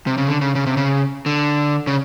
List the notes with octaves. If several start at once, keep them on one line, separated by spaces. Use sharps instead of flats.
C3
C#3
D3
C#3
C#3
C3
C#3
D3
C#3